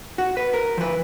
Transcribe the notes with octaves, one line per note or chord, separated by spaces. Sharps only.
F#4
B4
A#4
F3 B4